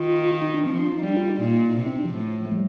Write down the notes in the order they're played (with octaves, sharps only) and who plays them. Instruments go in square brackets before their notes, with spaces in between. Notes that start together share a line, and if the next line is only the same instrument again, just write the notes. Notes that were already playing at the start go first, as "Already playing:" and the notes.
Already playing: [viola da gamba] D#3 [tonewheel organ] F4
[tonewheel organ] D#4
D4
[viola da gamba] F3 [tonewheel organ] C4
[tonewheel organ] D4
D#4
[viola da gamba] G3 [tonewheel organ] D4
[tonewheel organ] F4
D#4
[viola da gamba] A#2 [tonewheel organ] D#4
[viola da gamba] C3 [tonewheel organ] D#4
[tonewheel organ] C4
D4
F3
[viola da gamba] A2
[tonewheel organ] A3
G3